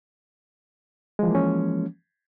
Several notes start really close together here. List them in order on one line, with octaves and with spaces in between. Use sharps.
G#3 F3 E3 A#3 C#4